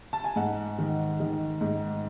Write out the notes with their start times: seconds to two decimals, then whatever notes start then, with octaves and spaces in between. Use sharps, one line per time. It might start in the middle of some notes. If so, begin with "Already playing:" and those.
0.13 A5
0.24 G#5
0.36 G#2 F#5
0.78 D#3
1.20 D#3
1.61 G#2